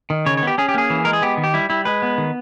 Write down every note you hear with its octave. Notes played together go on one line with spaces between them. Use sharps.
D#3
C#3 C#5
C#5
B3 G4
C#4 G#4
G4
A#3 G#4
E3
G#3 A#4
G#4
B3 G4
D#3
G4
G3 E4
G3 E4
G#3 B4
B3
D#3